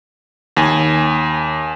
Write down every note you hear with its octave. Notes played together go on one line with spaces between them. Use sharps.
D#2 G#5